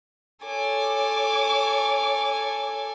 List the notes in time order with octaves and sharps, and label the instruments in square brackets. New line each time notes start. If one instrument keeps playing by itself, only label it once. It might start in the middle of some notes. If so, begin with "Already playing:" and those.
[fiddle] A4 G#5 [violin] C#5 D6